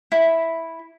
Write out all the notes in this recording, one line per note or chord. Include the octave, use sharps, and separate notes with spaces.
E4